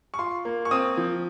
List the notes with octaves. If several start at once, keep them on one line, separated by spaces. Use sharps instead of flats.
C#6
F4 C6
A#3
C#6
C4 D#6
F3